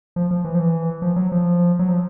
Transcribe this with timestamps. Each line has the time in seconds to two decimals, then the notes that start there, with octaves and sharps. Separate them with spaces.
0.16 F3
0.31 F3
0.45 E3
0.55 F3
0.59 E3
1.02 F3
1.16 F#3
1.32 F3
1.79 F#3
1.88 F3